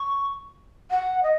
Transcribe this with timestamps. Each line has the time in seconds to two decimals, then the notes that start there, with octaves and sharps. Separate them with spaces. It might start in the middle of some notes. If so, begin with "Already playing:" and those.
Already playing: C#6
0.91 F#5
1.23 D#5